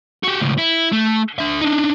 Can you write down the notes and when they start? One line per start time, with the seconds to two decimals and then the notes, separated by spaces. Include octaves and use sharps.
0.24 F#4 G4
0.42 C#2 A2
0.58 E4
0.93 A3
1.39 D4 E5
1.61 D4 D#4